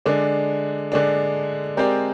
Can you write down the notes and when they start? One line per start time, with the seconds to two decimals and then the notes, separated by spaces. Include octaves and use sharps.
0.06 D3 G#3 D4
0.92 D3 G#3 D4
1.77 G#3 C4 G4 A#4 D5